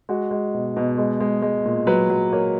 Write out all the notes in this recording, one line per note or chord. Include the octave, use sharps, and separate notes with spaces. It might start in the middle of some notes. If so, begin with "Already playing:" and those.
G#3 F#4
G#3
B2
B2
G#3
G#3
G#3
A#2
F#3 B4
F#3
A#3 C#5